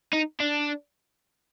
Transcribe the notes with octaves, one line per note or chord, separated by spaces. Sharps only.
D#4
D4